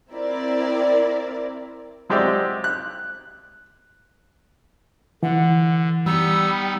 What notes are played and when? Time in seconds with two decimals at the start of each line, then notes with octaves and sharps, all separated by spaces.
0.11 C4 E4 A#4 D5
2.10 F#3 G#3 C4 G4 D5 E5
2.64 F#6
5.23 D3 E3 F#5
6.06 G3 B3 D#4 E6